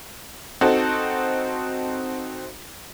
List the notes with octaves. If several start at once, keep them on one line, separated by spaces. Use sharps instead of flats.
C4 D#4 F#4 A4